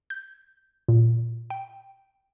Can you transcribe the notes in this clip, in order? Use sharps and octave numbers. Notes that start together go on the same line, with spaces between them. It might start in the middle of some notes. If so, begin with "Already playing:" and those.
G6
A#2
G5